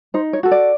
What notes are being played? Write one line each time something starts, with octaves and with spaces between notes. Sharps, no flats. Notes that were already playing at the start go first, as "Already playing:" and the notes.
D#4 C5
C#5
F#4 A4
D5